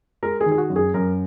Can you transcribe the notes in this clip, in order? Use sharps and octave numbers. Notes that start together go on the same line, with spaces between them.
G#3 A#4
G#4
D#3
G#4
F#4
F#2
G#4
F#2 A#4